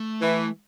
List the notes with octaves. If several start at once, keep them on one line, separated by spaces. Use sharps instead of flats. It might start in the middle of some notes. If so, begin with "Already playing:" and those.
Already playing: A3
E3